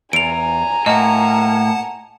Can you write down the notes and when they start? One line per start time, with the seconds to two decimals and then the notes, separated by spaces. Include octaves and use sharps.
0.13 E2 G#5 A#5 D7 F7
0.86 A2 A#3 D#5 F#5 A5